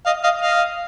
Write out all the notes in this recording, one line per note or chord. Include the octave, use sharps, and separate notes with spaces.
D#5 F5
D#5 F5
D#5 F5